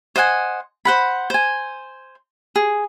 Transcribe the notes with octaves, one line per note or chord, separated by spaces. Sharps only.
C5 D#5 F#5 G#5
C5 F#5 B5
C5 G#5
G#4